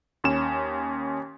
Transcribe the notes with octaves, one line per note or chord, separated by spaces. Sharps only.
D#2 C#4 E7